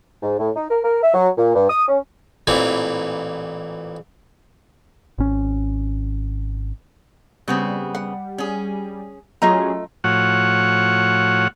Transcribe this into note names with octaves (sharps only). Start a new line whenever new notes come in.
G#2
A2
D#4
A#4
A#4
E5
F#3
A#2
G2
D#6
C#4
A1 A#2 E3 C4
G#1 C#4
C#3 G3 B3 C4
F#5
C#4 G#4
F#3 A3 C#4 F4 G#4 D#5 A#5
A2 F3 F#4 C#5 F#5